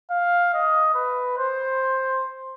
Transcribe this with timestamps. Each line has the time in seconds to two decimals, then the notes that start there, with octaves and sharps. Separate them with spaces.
0.11 F5
0.54 D#5
0.95 B4
1.38 C5